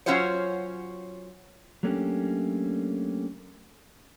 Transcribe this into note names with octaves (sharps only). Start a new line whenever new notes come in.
F#3 C#4 F4 F#4 C5 C#5
F#3 A3 A#3 C#4 D4 G4